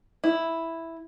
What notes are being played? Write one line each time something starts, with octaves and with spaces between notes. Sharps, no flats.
E4